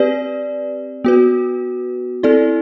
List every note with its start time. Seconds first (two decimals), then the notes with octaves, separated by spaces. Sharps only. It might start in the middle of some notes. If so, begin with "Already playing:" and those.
Already playing: C4 G4 B4 D5
1.04 B3 F#4 B4
2.23 C4 E4 A4 D5